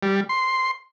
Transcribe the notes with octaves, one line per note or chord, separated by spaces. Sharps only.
G3
C6